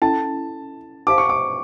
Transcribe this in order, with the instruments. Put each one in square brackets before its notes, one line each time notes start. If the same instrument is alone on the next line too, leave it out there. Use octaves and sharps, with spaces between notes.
[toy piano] C#4 E4 A4 [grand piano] A5
[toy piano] D#4 G4 C5 F5 [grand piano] D6
[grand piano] C#6
D6